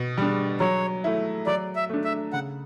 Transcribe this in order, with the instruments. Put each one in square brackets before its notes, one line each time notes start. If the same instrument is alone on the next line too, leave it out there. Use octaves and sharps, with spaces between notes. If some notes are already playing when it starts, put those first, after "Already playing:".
Already playing: [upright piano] B2
G3 D4
[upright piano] F#3 [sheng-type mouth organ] C#5
[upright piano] A3 E4
[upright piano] F#3 [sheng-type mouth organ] D5
[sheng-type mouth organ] E5
[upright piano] A3 D4
[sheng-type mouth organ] E5
[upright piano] C#3 [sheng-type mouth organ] F#5